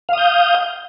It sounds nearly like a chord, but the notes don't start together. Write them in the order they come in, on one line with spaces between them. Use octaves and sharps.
F5 D#6 G6